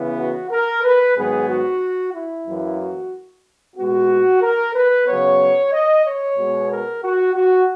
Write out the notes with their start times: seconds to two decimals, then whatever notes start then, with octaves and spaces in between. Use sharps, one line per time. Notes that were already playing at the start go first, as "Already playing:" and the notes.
Already playing: C#3 E3 B3 E4
0.18 F#4
0.50 A#4
0.83 B4
1.16 G#2 D#3 F#3 B3 G#4
1.48 F#4
2.14 E4
2.46 F#2 E3 A#3
2.79 F#4
3.76 A#2 G#3 B3 F#4
4.41 A#4
4.74 B4
5.06 C#3 F#3 B3 C#5
5.72 D#5
6.05 C#5
6.37 B2 G#3 B3
6.69 A#4
7.02 F#4
7.34 F#4